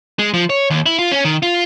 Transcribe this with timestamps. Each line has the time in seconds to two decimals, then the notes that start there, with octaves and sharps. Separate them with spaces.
0.19 G#3
0.34 F3
0.50 C#5
0.70 D#2
0.86 E4
0.99 F4
1.12 C#4
1.25 D#3
1.43 F4